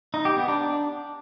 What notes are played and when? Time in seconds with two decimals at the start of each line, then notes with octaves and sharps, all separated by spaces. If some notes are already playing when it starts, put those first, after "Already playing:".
0.14 D#4
0.25 G4
0.37 B3
0.48 D4